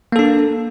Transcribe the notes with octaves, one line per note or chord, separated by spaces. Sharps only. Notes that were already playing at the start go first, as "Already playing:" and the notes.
A#3 D4 A4